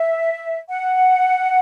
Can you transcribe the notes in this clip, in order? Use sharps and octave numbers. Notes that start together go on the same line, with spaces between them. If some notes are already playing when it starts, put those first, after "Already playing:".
Already playing: E5
F#5